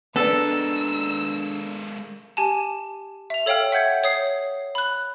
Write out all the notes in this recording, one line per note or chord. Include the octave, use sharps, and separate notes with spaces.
G#3 A#3 B3 D4 A4 E6
G4 G#5 A5
E5 F7
A4 C#5 F5 G5 F6
E5 F#5 G6 G#6 C#7
C#5 D#6 C7
B5 F#6